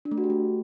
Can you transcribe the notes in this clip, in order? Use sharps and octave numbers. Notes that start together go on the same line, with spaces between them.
D4
A3
F#4
G4
A3